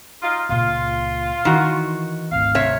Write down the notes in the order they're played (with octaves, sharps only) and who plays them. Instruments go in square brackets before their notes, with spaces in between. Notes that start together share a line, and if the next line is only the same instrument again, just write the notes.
[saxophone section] D#4 F4
[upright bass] C#2 A#2 [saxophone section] F4
[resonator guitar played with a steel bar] D#3 F#4 [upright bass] E3
[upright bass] G#1 D2 [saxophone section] F5
[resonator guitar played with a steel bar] C3 C#5 E5